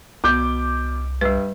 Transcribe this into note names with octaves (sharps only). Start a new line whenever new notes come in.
C2 B2 D6 G6
G2 G3 B4